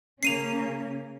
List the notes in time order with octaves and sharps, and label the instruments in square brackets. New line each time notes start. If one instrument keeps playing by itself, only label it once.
[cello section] C#3 A#3 C#4 [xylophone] C7 D#7 F7